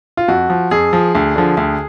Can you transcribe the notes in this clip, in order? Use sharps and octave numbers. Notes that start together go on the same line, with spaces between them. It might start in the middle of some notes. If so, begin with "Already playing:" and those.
F4
F2 F#4
F3
F2 G#4
F3
D2
D3 F3
D2